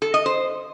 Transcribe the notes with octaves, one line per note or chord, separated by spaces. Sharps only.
A4
D#5
C5